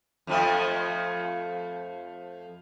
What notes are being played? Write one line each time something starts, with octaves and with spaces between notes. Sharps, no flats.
F2 F3 A3